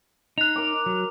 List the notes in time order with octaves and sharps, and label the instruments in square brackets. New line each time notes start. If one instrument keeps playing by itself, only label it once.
[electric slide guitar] D#4 [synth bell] F#6 F7
[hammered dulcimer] A#4 D6
[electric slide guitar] F#3